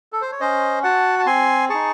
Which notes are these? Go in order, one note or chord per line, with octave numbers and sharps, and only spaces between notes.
A4
C5
C#5
C#4 C5 D#5
F#4 F#5 A5
A5
C4 G#5 C6
D#4 G#4 A5 C#6